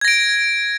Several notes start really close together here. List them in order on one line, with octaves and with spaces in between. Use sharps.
G#6 A#6 D7